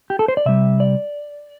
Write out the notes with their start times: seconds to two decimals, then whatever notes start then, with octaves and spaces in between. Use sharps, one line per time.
0.10 G4
0.19 A4
0.28 C5
0.37 D5
0.46 C3 G3 E5
0.80 D5